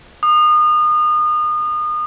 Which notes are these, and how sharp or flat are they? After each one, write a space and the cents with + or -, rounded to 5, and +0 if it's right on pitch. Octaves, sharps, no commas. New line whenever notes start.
D#6 -30